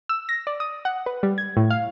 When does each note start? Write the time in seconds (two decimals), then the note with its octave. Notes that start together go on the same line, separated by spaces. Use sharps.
0.09 E6
0.29 A#6
0.47 D5
0.60 D#6
0.85 F#5
1.06 B4
1.23 G3
1.38 G#6
1.57 A2
1.70 F5